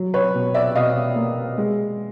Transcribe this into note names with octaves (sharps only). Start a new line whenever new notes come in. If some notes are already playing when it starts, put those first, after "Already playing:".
Already playing: F#3
B4 C#5
B2
D5 E5
B2 D#5 F5
A#3
G#3